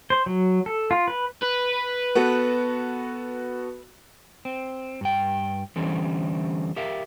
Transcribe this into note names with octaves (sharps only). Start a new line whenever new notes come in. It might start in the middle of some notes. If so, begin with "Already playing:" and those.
C5
F#3
A4
F4
B4
B4
B3 F#4 A4
C4
G2 G5
D3 E3 G3 A3 C4 C#4
G4 A#4 E5 F5